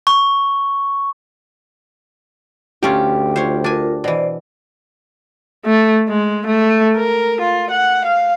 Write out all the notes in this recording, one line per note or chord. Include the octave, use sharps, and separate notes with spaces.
C#6
D2 A3 C#4 F4 G4
F4 C5 C#5
D4 F4 A#4 G#5
B2 E3 C5 D5
A3
G#3
A3
A#4
F4
F#5
F5